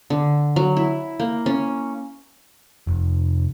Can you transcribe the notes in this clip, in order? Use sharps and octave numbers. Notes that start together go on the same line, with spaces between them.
D3
F#3
E4
A#3
C#4
F1